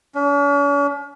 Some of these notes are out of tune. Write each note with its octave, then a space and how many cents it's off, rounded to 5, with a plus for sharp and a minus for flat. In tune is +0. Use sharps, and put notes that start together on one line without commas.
C#4 +45